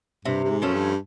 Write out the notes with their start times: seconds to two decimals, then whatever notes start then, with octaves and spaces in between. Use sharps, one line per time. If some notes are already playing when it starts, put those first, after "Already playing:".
0.25 G2 C3
0.44 G2
0.50 G#2
0.62 F#2 F3 A3 C#4
0.74 G2